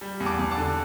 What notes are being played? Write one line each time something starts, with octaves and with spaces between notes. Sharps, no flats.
G3
E2
A5 D6
E2
A5 D6
D3